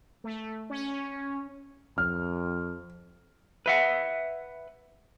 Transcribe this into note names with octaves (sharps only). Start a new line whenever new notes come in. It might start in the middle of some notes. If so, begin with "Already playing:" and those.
A3
C#4
F2 F6
B4 E5 F#5